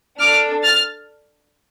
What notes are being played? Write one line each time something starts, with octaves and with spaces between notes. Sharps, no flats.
D4 A4 D6 F6
F6 A6